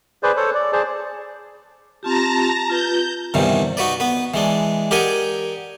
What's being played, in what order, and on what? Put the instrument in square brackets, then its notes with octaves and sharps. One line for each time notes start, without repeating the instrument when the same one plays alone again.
[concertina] G#4 B4 C5 D5
A4 C5 C#5
D5
G#4 C5 D5 A5
[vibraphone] C4 F4 G4 [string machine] A5 A#5 A#6
[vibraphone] F4 B4 [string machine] G6
[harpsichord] E2 G2 C3 D#3 E3
D#4 F#4 B4 D5
B3 B4
E3 G#3 D4
G4 A#4 D5 D#5 F#5 G#5